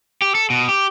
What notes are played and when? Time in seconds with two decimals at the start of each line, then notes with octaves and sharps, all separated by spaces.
0.22 G4
0.35 A4
0.50 B2
0.69 G4